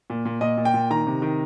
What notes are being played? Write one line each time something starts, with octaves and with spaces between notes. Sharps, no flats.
A#2
A#2
A#2 D#5
A#2
G5
A#2
D#3 A#5
C3
D#3